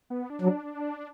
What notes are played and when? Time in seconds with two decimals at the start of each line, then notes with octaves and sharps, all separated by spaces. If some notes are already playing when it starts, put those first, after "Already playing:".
0.10 B3
0.30 D4
0.42 F#3